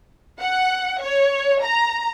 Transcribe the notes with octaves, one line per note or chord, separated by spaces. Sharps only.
F#5
C#5
A#5